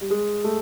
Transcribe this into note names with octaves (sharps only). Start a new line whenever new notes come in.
G3
G#3
A3